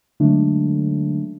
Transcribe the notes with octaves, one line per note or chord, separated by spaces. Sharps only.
D3 F#3 G#3 A3 C#4 D4